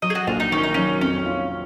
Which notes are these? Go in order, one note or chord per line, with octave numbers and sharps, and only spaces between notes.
F#3 D#5
G#4
F#4
A#1 F4
D#4
D#3 C#4
D#4
F#3 C#4
F2 C#4
F4